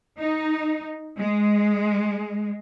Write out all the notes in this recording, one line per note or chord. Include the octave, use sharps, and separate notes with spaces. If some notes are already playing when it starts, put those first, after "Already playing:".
D#4
G#3